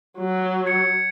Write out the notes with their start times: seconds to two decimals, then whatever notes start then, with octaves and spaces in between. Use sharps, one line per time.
0.19 F#3
0.66 G#6 C#7